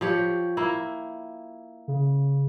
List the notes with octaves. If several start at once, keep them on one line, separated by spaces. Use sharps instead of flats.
F3 G4 C#5
A#3 E4
C#3